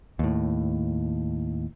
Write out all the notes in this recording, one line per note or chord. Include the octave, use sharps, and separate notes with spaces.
D#2 A2